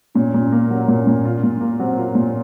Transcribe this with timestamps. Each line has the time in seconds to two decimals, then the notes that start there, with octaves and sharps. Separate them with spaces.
0.15 A#2 C#4
0.34 A#2
0.52 A#3
0.70 F#3 C#4
0.88 A#2
1.07 A#2
1.25 F4
1.43 A#2
1.61 A#3
1.79 F#3 C4
1.97 F4
2.15 A#2